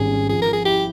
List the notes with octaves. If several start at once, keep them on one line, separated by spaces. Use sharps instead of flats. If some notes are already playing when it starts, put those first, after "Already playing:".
Already playing: G#1 G3 C#4 G#4
C#4
F3 G#4
A#4
F3
G#4
E4 G4